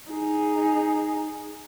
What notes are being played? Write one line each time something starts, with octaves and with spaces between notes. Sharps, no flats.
D#4 G#4